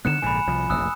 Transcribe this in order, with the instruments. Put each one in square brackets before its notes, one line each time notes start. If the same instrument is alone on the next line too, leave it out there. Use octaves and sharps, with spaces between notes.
[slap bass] D3 D#3 B3 [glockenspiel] F#6 C#7 E7
[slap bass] A#1 G#2 D3 [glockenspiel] G#5 B5
[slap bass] C2 F3
[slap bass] F1 A#1 [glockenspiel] D#6 E6 F#6